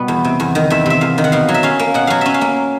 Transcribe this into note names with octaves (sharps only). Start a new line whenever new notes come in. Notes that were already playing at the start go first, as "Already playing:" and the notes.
Already playing: B2 G3 B3
E2
C3
E2
D#3
E2 E5
C3 E5
E2 F5
D#3
F#5
B2 F5
F#3
E5
C#4 F5
A#3
B2 F#5
F#3 F5
C#4 E5
F5
A#3